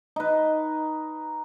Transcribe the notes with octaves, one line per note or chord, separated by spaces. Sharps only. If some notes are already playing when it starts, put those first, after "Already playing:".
D#4 B4